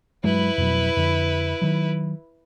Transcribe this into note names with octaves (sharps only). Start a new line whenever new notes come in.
G2 F#3 G#3 E4 B4
F2 B2 F#3
F2 D3
D#3 F#3